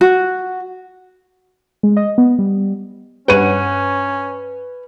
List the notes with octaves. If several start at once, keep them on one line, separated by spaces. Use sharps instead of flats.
F#4
G#3
D#5
B3
G3
G2 C#4 B4 C#5 F#5 D#7